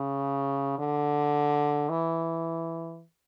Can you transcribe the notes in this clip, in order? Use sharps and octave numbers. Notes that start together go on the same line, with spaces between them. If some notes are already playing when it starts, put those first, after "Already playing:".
Already playing: C#3
D3
E3